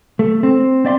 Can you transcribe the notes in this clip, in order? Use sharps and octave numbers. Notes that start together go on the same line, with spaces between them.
A3
C4
C4 D5 E5 C6